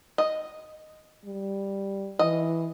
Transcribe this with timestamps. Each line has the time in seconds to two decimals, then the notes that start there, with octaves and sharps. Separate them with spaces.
0.18 D#5
1.25 G3
2.19 E3 D#5